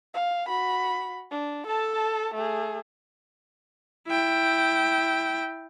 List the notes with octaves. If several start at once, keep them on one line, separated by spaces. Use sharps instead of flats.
F5
F#4 B5
D4
A4 A5
A3 G#4
E4 G5